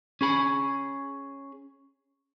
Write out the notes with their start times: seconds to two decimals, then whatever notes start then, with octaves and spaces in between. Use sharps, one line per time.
0.21 C#4 G#4 B5